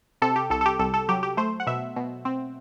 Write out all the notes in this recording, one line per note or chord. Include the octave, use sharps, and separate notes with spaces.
C3 A4
G4
C2 A4
A4
G4
C2 A4
A4
F#3 G4
G4
A3 C5
F#5
B2 E5
B2
C4